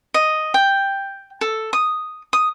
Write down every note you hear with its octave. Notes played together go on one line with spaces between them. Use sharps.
D#5
G5
A4
D#6
D#6